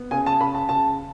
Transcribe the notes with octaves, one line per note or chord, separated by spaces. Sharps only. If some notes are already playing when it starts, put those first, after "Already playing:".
Already playing: B3
C#3 G#5
A5
C#3 B5
A5
C#3 A5